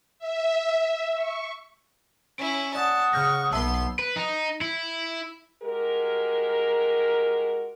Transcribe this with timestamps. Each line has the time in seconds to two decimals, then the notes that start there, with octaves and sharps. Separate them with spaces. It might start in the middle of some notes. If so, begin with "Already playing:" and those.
0.19 E5
1.15 C#6
2.38 C#4 E4 D7
2.75 D5 F#5 A5 D#6 F#6
3.13 C#3 C#6 F6 G6 A#6
3.52 B1 B3 E5 A5 C6 E6 G6
3.99 B4
4.16 D#4
4.61 E4
5.63 G#3 F#4 G4 A#4